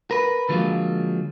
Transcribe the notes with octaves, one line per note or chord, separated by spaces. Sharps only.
A#4 B4
D3 F3 F#3 G#3 A#3